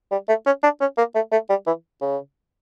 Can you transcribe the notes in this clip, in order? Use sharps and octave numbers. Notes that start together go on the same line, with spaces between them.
G3
A3
C#4
D4
C#4
A#3
A3
A3
G3
E3
C#3